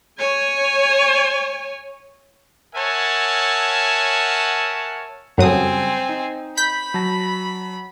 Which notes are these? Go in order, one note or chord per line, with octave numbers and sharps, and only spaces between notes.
C#5 G#5
A#4 C#5 E5 F#5 G#5 A5
F#2 C#3 F#3 G3 C4 A4 G#5 D#6
D#4
B5 G6 B6
F#3 A5 A#6